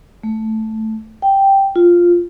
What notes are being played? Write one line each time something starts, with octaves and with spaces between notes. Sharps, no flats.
A3
G5
F4